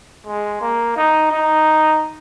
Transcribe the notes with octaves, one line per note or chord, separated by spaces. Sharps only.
G#3
A#3
D#4
D#4